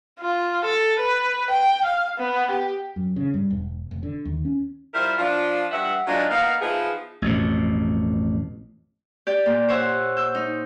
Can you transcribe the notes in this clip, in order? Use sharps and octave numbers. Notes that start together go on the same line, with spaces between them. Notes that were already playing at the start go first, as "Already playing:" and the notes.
F4
A4
B4
G5
F5
B3
G4
F#2
C#3
G2
E1
F1
D3
D#2
C#4
G3 E4 F4 A#4 C5
F3 D4 F4
G2 E5 F#5
F#3 G#3 A#3 D4 D#4 F4
A#3 B3 D#4 F5
E3 F3 B3 D#4 G#4
A1 F2 B2
G4 D5 G6
A#2
C5 C#5 E5 F#5
E6 G6
D#4